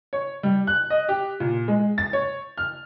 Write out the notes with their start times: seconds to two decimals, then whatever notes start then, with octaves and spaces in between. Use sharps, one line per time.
0.13 C#5
0.43 G3
0.67 F#6
0.90 D#5
1.09 G4
1.40 A#2
1.68 G#3
1.98 A6
2.13 C#5
2.57 F6